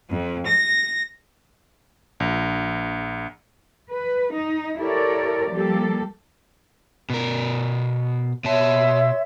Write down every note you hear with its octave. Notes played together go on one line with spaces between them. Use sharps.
F2
A#6
A#1
B4
D#4
E4 G4 A4 A#4 C#5 D5
F3 G3 A#3 G4 A4
B2 A#4
B2 C#5 E5 A5 C6